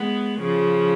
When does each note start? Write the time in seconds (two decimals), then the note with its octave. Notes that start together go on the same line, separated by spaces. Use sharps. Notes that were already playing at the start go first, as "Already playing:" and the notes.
Already playing: G#3 B3
0.39 C#3 F3